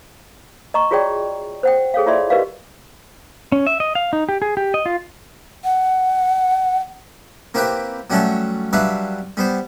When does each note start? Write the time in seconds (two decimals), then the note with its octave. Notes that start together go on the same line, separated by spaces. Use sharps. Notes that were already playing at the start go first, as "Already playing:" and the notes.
0.74 D#5 A#5 C#6
0.91 F4 F#4 G#4 C#5 D5 G5
1.63 C5 F#5 G5
1.94 G#4 A4 C#5 F5
2.06 E4 F4 C#5 D5 E5 C6
2.30 F#4 G4 A#4 B4 D#5 F5
3.52 C#4
3.67 E5
3.80 D#5
3.95 F5
4.13 D#4
4.29 G4
4.42 G#4
4.57 G4
4.74 D#5
4.86 F4
5.64 F#5
7.54 A#3 C4 E4 G4 B4 G5
8.10 F#3 G3 A3 C#4 F#4 A4
8.73 F#3 G3 D4 B4 E5 F5
9.37 G3 B3 C5